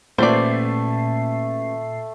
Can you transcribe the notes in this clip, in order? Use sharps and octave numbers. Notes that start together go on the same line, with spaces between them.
A1 A#2 A3 C5 D5 C7